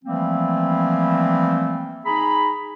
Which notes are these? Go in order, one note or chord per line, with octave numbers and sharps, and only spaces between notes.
E3 F3 G3 A3 A#3 C4
D#4 G#4 A#5 B5